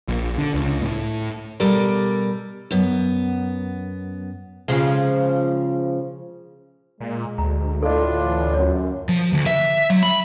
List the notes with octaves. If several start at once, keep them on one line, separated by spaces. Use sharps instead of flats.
A#1
D3
C#2
A2
B2 G3 A4 A#4 D5 A#5
F#2 B3
C#3 F3 G#3
A#2 G#3
D2 A#5
A2 D4 F4 A4 D#5
E3
F#2 C#5
F3
D2
E5
F#3
B5